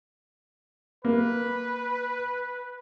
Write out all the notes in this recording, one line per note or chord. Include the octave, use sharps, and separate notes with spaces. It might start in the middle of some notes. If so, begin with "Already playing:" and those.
A#3 B4